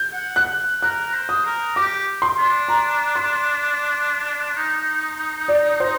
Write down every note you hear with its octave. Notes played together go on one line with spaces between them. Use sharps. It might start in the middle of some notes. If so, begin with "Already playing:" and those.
Already playing: G6
F#5
F#6
A#4 F#6
C5
D#6
A#4
G4 D6
C6
D4
A#5
C6
D#4
D5
C5